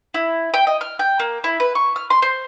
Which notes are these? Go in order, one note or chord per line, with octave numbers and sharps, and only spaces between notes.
E4
G5
D#5
F6
G5
A#3
E4
B4
C#6
F6
C6
C5